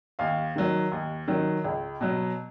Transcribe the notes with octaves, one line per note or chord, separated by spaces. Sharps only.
D#2 F5
D#3 F#3
D#2
D#3 F#3
C#2
B2 F#3